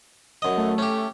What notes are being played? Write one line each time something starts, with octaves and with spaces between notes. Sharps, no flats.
F#2 D#5
A3
C#4 G4